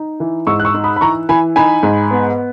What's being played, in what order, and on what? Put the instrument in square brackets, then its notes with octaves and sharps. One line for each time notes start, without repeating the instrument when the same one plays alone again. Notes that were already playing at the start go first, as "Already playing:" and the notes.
Already playing: [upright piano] D#4
E3
G#2 C#6 E6
F#6
C#6 E6
D#4
B5 D#6
B5
E3 A#5 C#6
E3 G#5 B5
D#4 G#5 B5
G#2
B3